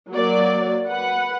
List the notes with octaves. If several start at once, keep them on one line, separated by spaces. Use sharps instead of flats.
F#3 A#3 D5
B4 F#5